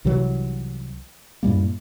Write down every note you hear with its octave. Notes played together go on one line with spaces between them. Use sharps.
C2 C3 E3 F#3
F#2 A2 G3 A#3